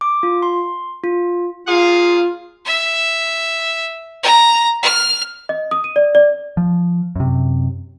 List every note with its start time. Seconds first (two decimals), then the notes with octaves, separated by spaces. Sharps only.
0.01 D6
0.23 F4
0.43 C6
1.04 F4
1.67 A#2 F4 G#4 F5
2.66 E5
4.23 A#5
4.83 F6
5.49 D#5
5.71 D#6
5.84 D#7
5.96 D5
6.15 D5
6.57 F3
7.16 F#2 C3